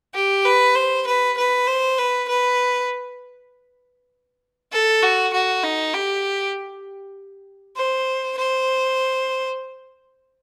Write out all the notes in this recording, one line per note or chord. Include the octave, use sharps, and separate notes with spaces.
G4
B4
C5
B4
B4
C5
B4
B4
A4
F#4
F#4
D#4
G4
C5
C5